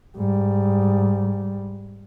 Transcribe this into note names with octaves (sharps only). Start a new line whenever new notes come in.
G#2 G3